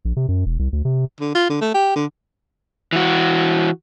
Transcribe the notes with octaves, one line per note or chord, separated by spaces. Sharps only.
A#1
C3
F#2
E1
C2
D2
C3
D3
F4
D3
A3
G4
D3
E3 F#4